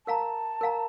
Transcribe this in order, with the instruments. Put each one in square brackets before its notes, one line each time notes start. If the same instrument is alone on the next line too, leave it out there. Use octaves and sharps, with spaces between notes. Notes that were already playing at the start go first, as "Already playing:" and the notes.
[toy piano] A#4 F5 A#5 [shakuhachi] A5
[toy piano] A#4 F5 A#5